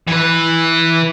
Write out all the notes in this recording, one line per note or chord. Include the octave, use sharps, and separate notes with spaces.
E3 B4